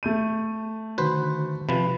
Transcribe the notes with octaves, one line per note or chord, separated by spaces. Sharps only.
A3 G6 D#7
D3 D#3 F#4 B4 C5
C3 F3 B4 B5